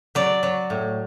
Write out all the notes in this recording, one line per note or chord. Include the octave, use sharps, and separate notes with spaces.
F#3 D5
F#3
A2